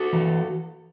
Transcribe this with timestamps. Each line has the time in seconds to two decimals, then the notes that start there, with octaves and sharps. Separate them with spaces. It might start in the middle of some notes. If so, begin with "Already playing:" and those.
Already playing: F#4 A4
0.13 E3